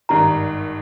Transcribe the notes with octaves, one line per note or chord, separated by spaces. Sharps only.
G#1 G2 D#3 A#5